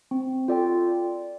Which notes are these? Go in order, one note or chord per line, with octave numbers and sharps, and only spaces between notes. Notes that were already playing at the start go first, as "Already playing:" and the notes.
C4
F4 A4 D5 G5